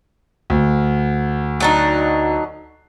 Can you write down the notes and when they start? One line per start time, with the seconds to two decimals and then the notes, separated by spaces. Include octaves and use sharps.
0.50 D2
1.60 F#3 D4 D#4